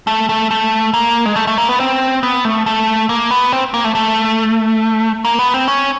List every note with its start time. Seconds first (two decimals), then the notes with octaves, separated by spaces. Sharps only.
0.07 A3
0.29 A3
0.51 A3
0.94 A#3
1.26 G#3
1.36 A3
1.47 A3
1.58 A#3
1.69 B3
1.80 C4
2.23 B3
2.45 A3
2.66 A3
3.09 A#3
3.31 B3
3.53 C4
3.74 A#3
3.84 A3
3.95 A3
5.25 A#3
5.39 B3
5.54 C4
5.68 C#4